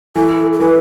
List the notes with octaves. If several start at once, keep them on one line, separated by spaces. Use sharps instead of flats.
E3 A4
A4
E3 B4